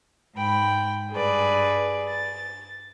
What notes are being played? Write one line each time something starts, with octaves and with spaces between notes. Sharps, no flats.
G#2 G5 B5
G2 G#4 B4 D5
A6